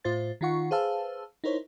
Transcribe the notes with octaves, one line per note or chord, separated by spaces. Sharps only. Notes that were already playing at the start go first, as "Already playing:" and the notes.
A2 F4 C5 A6
D#3 D#4 F4 F#5 C#6
G#4 B4 C5 F5 A5 E6
D#4 E4 A#4 C5 C#5